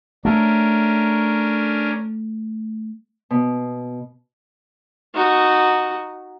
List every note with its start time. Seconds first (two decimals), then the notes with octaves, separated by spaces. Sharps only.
0.25 A3 C#4 D4 A#4
3.30 B2
5.15 D#4 F#4